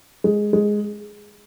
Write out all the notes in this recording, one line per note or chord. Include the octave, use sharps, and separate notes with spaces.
G#3
G#3